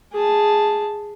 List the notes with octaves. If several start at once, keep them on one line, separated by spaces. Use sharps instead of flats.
G#4 A5